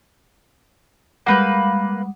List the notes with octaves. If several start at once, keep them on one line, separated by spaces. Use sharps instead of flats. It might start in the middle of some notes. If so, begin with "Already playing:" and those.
G3 G#3 A#3 B4 F#5 G6